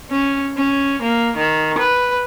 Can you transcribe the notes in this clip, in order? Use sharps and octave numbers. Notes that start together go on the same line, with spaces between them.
C#4
C#4
A#3
D#3
B4